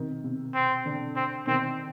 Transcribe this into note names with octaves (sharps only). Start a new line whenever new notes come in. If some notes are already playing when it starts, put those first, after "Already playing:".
Already playing: C3 D#3
C3
C4
D3
C4
C3 D#3 C4